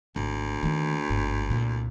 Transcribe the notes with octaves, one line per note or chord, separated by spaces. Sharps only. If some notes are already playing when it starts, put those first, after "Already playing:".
G#1 D2
D#3 A#3
G1 G#2
C2 A#2